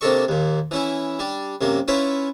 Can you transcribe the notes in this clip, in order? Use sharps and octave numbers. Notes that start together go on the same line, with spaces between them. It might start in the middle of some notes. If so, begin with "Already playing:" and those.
C3 A#3 D4 A4 D#5 C#6
D#2 A#2
E3 C#4 E4
G3 D4
F#2 C3 A#3
C#4 E4 F4 B4 C#5